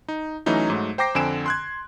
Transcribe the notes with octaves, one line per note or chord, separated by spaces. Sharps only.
D#4
E3 F#3 A3 C#4 D#4 E4
G#2 F#3 A3
C5 G5 A#5 D6 A#6 C7
F2 D3 C4 G#5 D7 E7
C6 F#6 G#6